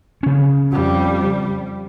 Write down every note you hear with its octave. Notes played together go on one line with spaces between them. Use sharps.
C#3 C#4
F2 G3